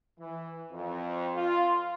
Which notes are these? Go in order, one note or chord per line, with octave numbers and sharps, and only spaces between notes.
E3
F2
F4